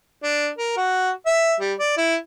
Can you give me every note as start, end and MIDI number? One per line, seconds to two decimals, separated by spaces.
0.23 0.49 62
0.58 0.73 70
0.77 1.10 66
1.26 1.55 76
1.60 1.73 55
1.79 1.94 74
1.97 2.15 64